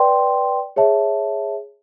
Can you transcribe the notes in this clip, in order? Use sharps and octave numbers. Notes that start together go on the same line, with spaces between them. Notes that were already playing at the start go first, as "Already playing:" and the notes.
Already playing: B4 D5 G5 C6
G#4 C#5 E5 A5